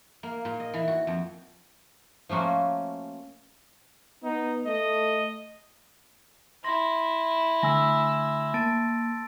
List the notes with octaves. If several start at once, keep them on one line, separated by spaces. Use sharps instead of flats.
A#3
A#2
D#5
E3
F#4
F2
F3 A3 A#3 C#4 F#4
B3 D#4
A3 D#5
E4 C6 A#6
D3 A3 G#5 E6 A#6
A#3 A5 A6 D7